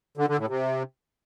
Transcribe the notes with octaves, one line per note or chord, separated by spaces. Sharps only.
D3
D3
A2
C3